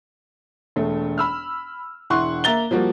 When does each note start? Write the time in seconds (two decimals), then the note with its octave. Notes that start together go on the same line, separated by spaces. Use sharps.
0.76 E1 A3
1.18 B5 E6 F6
2.10 E1 E4 F#5 C6 C#6 F#6
2.44 A#3 E5 A#5 A6 G7
2.71 F3 G3 A#3 F#4